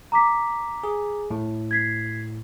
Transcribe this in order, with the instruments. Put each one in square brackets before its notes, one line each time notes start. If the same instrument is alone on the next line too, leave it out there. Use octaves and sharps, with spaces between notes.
[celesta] A#5 D6 B6
[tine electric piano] G#4
A2
[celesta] G#6 B6 C7